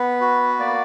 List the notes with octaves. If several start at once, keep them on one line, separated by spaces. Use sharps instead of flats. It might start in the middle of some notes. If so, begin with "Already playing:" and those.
Already playing: B3 B4
F#4
A#3 D5